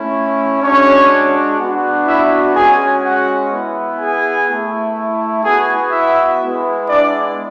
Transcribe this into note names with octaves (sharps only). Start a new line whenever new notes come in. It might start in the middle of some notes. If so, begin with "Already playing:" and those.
Already playing: A3 C#4 E4
G#3 C#4 D4 F#4 C#5
B3 D4 F#4
E4 E5
G#3 C#4 F#4 G#4 G#5
F#4 F#5
B3 E4
G#4 G#5
A3 E4
B3 F#4 G#4 G#5
E4 E5
G#3 B3 E4
D4 D5